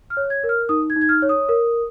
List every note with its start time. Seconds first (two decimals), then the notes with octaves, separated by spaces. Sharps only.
0.10 F6
0.17 C#5
0.30 G#6
0.44 A#4
0.49 F6
0.69 D#4 D#6
0.90 G#6
0.96 D#4
1.01 G#6
1.09 F6
1.22 C#5
1.29 D#6
1.49 A#4